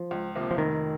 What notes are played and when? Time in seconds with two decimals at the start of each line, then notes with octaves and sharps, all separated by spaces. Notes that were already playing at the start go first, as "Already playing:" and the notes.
Already playing: F3
0.11 C#2
0.35 C3 F3 A#3
0.51 F3
0.58 F1 D#3